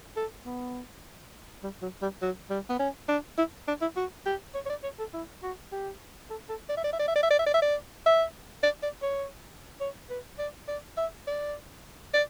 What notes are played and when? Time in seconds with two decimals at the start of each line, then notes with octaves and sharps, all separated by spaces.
0.16 A4
0.45 B3
1.63 G3
1.82 F#3
2.02 G3
2.21 F#3
2.50 G3
2.69 B3
2.79 C#4
3.08 D4
3.38 E4
3.68 D4
3.81 E4
3.96 F#4
4.26 G4
4.54 C#5
4.66 C#5
4.69 D5
4.83 C#5
4.99 A4
5.13 E4
5.43 F#4
5.72 G4
6.30 A4
6.49 A4
6.69 D5
6.77 E5
6.84 D5
6.93 E5
6.99 D5
7.08 E5
7.15 D5
7.23 E5
7.30 D5
7.39 E5
7.46 D5
7.54 E5
7.62 D5
8.06 E5
8.63 D5
8.83 D5
9.02 C#5
9.80 C#5
10.10 B4
10.38 D5
10.68 D5
10.97 E5
11.27 D5
12.13 D5